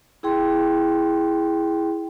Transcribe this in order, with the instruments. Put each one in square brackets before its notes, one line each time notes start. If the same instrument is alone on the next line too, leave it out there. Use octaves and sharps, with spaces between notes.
[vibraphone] E4 G#4 G5 C6